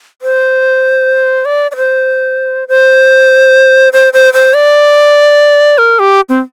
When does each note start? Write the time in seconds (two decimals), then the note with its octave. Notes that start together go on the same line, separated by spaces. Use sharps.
0.22 C5
1.45 D5
1.71 D5
1.76 C5
2.68 C5
3.93 C5
4.13 C5
4.33 C5
4.54 D5
5.78 A#4
5.99 G4
6.29 C4